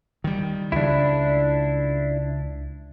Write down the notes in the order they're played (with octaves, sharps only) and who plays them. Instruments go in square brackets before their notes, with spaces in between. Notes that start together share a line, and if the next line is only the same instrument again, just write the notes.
[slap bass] D#3 G3
[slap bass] C#2 [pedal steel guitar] D4 E4